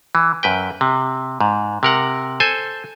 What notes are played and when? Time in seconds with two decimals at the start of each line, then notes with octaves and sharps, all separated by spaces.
0.15 E3
0.43 F#2 B4 G5
0.81 C3
1.41 G#2
1.83 C3 A#4 F#5
2.40 A4 C5 G#5